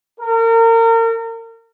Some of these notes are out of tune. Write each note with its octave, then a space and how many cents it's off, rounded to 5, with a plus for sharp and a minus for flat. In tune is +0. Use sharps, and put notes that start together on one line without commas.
A#4 -35